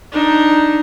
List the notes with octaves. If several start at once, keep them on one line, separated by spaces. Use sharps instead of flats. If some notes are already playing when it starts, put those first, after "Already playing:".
D4 D#4